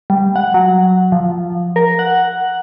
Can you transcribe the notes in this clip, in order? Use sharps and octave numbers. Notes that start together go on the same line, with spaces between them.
G3
F#5
F#3
F3
A#4
F#5